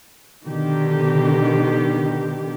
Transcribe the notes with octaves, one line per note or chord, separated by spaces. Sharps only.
B2 D3 D#3 G4